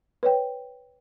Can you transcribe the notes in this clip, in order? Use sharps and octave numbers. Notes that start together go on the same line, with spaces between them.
B4 C#5 G5